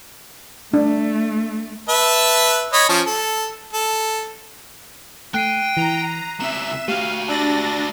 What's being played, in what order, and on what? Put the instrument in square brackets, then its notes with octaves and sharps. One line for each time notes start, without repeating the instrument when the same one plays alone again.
[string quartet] A3 [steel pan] D4
[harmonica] B4 E5 A5
C#5 D#5 B5
F3 C#4 A5
A4
A4
[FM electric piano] A3 [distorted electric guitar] G5 [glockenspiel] F#6 C7 D#7
[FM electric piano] E3 [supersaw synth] A#5
[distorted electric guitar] C#2 C4 [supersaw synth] E5 E7 [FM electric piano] A#5
[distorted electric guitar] A3 F#4 [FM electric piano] G4 [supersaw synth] F5 [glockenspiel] D#7
[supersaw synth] D4 A6 A#6 [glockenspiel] A5 E6 F#7